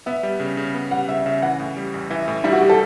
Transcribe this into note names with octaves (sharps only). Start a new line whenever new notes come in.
B3 E5
G3
C#3
C#3
B3
G3 F#5
C#3 E5
C#3 E5
E3 F#5
A2
G3
A1
E3 E5
A2
G3 E4
F#4
G4
A4